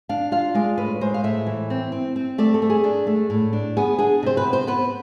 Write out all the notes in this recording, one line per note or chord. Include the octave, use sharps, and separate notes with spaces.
D4 F5
F4 F5
G#3 D5
A2 B4
G#3 C5
F5
A2 E5
E3
C4
C4
C4
A3 D5
A4
A3
G#4
D4
A3
A2
D4
B3 G#4
D4 G#4
C3 C5
B4
B3
C5
B3 B4